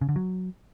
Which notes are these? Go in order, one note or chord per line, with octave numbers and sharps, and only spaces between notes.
C#3
D3
F#3